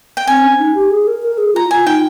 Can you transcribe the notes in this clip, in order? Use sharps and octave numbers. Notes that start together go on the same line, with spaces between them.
G5
C4 G#5
C#4
D#4
G4
G#4
A#4
A#4
G#4
F4 A#5
F4 G#5
D#4 G5